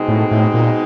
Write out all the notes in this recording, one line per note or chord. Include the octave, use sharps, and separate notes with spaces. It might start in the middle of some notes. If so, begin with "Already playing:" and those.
Already playing: B2 G#3 C4 D#4
A2
A2
A#2